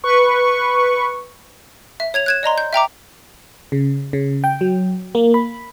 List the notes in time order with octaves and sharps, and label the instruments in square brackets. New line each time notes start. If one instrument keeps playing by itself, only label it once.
[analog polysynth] B4 C#6
[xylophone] E5
C#5 G#6 F7
F#6 G#6 E7
D5 D#5 A#5 C6
G6
E5 G5 A#5 D6
[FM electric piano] C#3
C#3
G5
F#3
A#3
B5